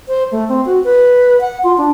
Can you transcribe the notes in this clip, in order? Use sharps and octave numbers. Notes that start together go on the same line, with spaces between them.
C5
A3
C4
F#4
B4
F#5
F4
D4